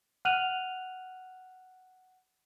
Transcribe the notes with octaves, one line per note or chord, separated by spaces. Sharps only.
F#5 F6 F#6 D#7 F7 F#7